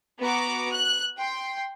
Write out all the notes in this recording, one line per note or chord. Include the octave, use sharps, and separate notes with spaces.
B3 F#4 A#5 D6
F#6
G5 C6